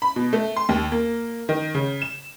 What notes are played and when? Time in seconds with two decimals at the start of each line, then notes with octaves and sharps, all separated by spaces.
0.02 B5
0.16 B2
0.33 A3
0.57 C6
0.69 D#2
0.92 A#3
1.49 D#3
1.75 C#3
2.02 E7